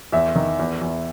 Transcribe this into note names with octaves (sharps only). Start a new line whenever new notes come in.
E2 E5
D#3
E2
E2